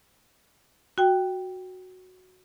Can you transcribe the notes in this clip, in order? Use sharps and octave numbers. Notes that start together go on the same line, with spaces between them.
F#4 G5